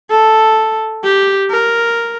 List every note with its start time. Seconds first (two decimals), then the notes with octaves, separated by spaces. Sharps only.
0.10 A4
1.04 G4
1.51 A#4